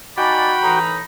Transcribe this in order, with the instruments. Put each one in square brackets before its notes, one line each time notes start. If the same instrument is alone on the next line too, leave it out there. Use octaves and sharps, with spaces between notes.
[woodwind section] D#4 D5 [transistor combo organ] F#4 G5 [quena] G#5 [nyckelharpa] B5
[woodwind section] A2 E3 D#4 [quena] A#5